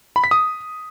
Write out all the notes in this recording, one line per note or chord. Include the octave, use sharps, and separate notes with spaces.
B5
B6
D#6